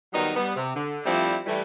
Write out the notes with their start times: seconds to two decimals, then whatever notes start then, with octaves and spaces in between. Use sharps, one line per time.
0.14 D#3 F#3 G3 B3 D#4
0.36 G3 B3
0.56 C3
0.75 D3
1.05 F3 G3 A3 C4 D4 E4
1.46 E3 G3 A3